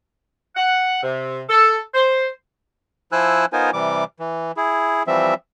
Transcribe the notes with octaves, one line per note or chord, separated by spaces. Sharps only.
F#5
C3
A4
C5
F3 E4 C5 G#5 E6 F#6
B3 D#4 F4 A#4 C5 G#5
C3 E3 G3 D6
E3
E4 G#4
E3 F3 G3 C4 E5